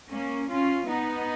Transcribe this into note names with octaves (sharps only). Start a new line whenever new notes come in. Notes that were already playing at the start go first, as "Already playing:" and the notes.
A#3 C#4
C#4 F4
B3 D#4